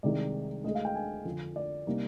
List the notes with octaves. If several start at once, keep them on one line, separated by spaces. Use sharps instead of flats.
C2 C3 D#3 G#3 D#4 D5
D2 D3 G#3 D#5
F5
G5
G#5
F2 D3 F3
D5
C3 G3 A#3 D#4